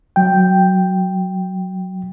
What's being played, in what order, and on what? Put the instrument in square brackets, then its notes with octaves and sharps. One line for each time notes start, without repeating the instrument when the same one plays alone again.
[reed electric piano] F#3 G5